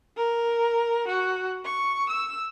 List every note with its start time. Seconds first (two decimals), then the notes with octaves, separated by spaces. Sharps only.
0.17 A#4
1.08 F#4
1.65 C#6
2.10 E6